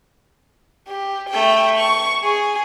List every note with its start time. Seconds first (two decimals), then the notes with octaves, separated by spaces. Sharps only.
0.88 G4
1.29 A3 G5
1.77 C#6
2.24 G#4